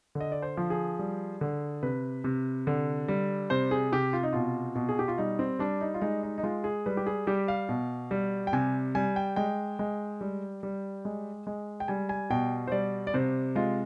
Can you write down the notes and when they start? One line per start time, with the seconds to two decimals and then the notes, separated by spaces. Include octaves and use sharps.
0.15 D3
0.21 D#5
0.32 D5
0.42 C5
0.57 F3
0.70 G#4
0.99 G3
1.41 D3
1.83 C3 B4
2.24 C3
2.67 D3
3.08 G3
3.50 C3 C5
3.71 G#4
3.92 C3 G4
4.13 F4
4.23 D#4
4.33 B2 F4
4.75 B2
4.89 G#4
4.99 G4
5.08 F4
5.18 G3 D#4
5.39 C4
5.59 G3 D4
5.81 D#4
5.94 F4
6.01 G#3 D#4
6.23 D#4
6.38 D#4
6.43 G#3 F4
6.64 G#4
6.86 G3 B4
6.97 G4
7.06 G#4
7.27 G3 G4
7.48 F5
7.69 B2
8.11 G3
8.47 G5
8.53 C3 G#5
8.95 G3 G#5
9.16 G5
9.36 G#3 G5
9.79 G#3
10.21 G3
10.63 G3
11.05 G#3
11.47 G#3
11.80 G5
11.88 G3 G#5
12.09 G#5
12.30 B2 G5
12.67 C5
12.72 G3 D5
13.07 D5
13.14 C3 C5
13.56 G#3 F4